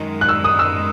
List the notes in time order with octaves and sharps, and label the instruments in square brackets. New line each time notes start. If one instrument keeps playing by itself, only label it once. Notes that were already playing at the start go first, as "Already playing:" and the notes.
Already playing: [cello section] F#2 D#3 G#3
[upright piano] F#6
E6
D#6
E6